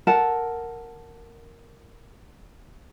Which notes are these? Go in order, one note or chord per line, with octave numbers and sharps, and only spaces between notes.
A4 A#4 F#5 A5